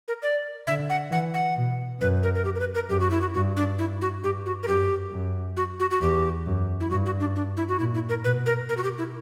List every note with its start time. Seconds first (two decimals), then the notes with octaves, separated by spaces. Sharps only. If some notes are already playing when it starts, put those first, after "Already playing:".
0.08 A#4
0.22 D5
0.67 D3 E5
0.90 F#5
1.11 E3 F#5
1.34 F#5
1.57 B2
2.00 F#2 B4
2.23 A#4
2.35 A#4
2.45 G4
2.55 A#4
2.60 B4
2.75 A#4
2.90 F#2 G4
3.00 F#4
3.11 E4
3.21 F#4
3.34 G2 F#4
3.57 D4
3.78 E4
4.01 F#4
4.23 G2 G4
4.46 F#4
4.63 A#4
4.68 F#2 G4
5.12 F#2
5.57 F#4
5.80 F#4
5.91 F#4
6.01 E2 G4
6.46 F#2
6.80 E4
6.90 G2 F#4
7.06 F#4
7.20 D4
7.36 D4
7.57 E4
7.69 F#4
7.79 A#2 E4
7.94 E4
8.09 A#4
8.24 B2 B4
8.46 A#4
8.69 B2 A#4
8.77 F#4
8.84 G4
8.98 E4